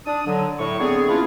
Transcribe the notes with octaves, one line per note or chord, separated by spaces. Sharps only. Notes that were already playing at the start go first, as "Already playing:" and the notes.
D4 D#6
D3 F#3
A2 C#6
D3 B3 C4 G#4
E3 A#3 C#4 D4 E4 F4